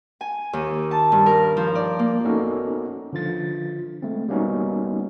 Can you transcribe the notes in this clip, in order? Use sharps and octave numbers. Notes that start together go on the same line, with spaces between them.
G#5
D#2
A5
G2
A#4
F3
D5
A#3
B3 C#4 D#4 F#4 A4 A#4
D3 F3 F4 A6
G#3 A3 C4
G3 A#3 B3 C#4 D#4 F#4